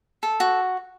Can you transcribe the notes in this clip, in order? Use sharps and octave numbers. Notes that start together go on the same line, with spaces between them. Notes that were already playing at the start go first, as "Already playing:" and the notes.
A4
F#4